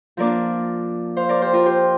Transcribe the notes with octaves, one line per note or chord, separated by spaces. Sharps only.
F3 A#3 D4 A#4 D5
C5 F5
A#4 D5
G4 C5
F4 A#4
G4 C5